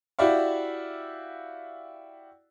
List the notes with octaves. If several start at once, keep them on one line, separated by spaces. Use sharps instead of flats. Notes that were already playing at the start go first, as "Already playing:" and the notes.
E4 F#4 G4 D5 E5 F5